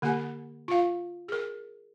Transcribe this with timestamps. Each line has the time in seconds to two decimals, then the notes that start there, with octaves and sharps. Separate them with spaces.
0.02 D3 A#3 G4 F#5 G#5
0.68 F4 F5
1.28 G#4 A#4